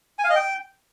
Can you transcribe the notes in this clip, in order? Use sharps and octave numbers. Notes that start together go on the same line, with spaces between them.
G#5
F5
D#5
G5